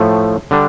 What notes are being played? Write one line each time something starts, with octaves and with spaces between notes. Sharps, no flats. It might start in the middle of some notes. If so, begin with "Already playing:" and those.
Already playing: A2 F3 A3
D3 G3 D4